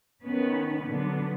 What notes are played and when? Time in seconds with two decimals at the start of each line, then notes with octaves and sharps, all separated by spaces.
0.25 D#3 B3 C#4 B4
0.84 A#2 D3 F#3 B3